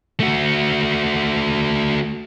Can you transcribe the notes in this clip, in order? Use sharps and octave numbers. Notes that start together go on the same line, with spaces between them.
A3 F#4